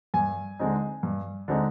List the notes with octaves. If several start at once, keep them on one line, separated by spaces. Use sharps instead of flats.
G2 G#5
D3 G#3 C4 D#4
G2
D3 G#3 C4 D#4